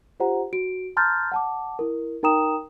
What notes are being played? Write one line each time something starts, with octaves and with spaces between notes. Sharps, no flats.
F4 G4 C5 F#5 A#5
F#4 D7
A5 A#5 C6 F6 G6 A6
F#5 A5 D6
E4 A#4
D#4 A#4 G5 A#5 D#6 E7